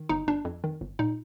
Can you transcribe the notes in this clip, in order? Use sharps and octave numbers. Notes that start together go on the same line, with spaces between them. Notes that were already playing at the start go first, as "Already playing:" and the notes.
Already playing: D#3
G1 D#4
G1 D4
F2
D#3
G1
A#2 D#4